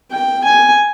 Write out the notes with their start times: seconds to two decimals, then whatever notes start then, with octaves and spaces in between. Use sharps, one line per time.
0.12 G5
0.44 G#5